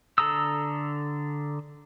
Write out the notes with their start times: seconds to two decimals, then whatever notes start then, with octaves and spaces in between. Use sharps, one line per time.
0.18 D3 A4 A#5 D#6 E6